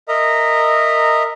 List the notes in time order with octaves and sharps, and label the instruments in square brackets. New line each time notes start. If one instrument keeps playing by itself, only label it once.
[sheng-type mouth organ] A#4 D#5 E5 A#5